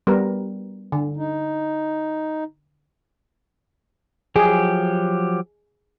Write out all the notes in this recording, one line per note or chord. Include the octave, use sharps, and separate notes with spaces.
G3 B3 A#4
D3
D#4
F3 F#3 G4 G#4